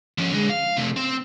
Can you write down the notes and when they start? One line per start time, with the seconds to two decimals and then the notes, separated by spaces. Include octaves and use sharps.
0.18 F3 C#4
0.33 D3 G#3
0.49 F5
0.77 C3 A3
0.97 C4